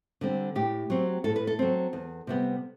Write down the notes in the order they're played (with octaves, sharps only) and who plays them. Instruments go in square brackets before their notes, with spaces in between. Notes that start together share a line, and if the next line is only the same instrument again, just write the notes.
[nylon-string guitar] D3 G3 C4
A2 G4
F#3 C4
A2 A4
B4
A4
F#3 C4
E2
C3 G3 B3